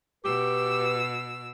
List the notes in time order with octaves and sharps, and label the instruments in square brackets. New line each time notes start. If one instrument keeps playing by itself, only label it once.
[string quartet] B2 E6 [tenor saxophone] G4 [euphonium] B4